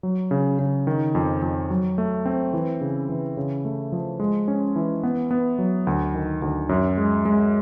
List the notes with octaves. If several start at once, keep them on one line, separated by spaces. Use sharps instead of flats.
F#3
C#3
C#3
D#3
F2
F2
F#3
A3
C4
E3
C#3
E3
C#3
A3
F3
G#3
C#4
E3
B3
B3
F#3
D2
D#3
D2
F#2
G#3
G#3